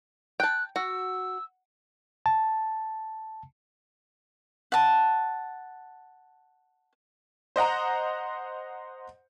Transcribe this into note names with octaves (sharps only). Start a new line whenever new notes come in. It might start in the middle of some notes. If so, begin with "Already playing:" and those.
G5 A5 F#6
F#4 E6
A5
F#5 A5
C5 D#5 F#5 A#5